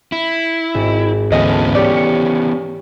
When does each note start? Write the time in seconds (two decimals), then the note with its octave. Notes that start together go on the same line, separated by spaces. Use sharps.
0.12 E4
0.75 G#1
1.32 D2 E3 B3 C#4 A4 D#5
1.75 G4 C#5 D5 C#6
1.97 C#7